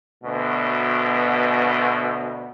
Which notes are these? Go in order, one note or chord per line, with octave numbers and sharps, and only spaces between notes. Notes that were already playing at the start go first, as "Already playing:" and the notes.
D2 B2